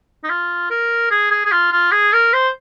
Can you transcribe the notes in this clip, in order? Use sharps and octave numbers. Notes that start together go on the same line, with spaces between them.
D#4
F4
A#4
G#4
G#4
G#4
F4
F4
G#4
A#4
C5